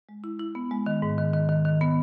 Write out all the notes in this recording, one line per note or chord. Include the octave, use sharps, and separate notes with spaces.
G#3
E4
E4
B3
G#3
D#3
G#2
D#3
D#3
D#3
D#3
B3